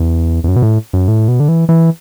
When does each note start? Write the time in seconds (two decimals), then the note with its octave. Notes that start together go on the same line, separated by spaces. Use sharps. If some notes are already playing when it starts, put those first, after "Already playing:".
Already playing: E2
0.44 E2
0.48 F#2
0.56 B2
0.62 A2
0.93 F#2
1.08 A2
1.28 B2
1.40 D3
1.48 E3
1.69 E3